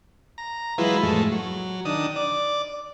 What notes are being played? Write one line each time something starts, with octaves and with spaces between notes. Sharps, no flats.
A#5
E3 F#3 G#3 E4 F4 B4
F2 A2 G#3 A3
F#3
D#3 D4 D#6
D5